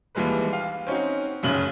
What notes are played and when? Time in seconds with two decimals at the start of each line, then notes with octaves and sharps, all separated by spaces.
0.15 D#2 E3 G3 G#3 B4
0.53 F5
0.87 C4 C#4 D#4 F#4
1.43 F1 F#2 C#3 F#7